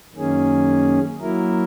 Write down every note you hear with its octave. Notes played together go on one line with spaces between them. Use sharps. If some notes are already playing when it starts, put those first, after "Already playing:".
F#2 D#3 A#3 C#4 G#4
F#3 A#3 E4 A#4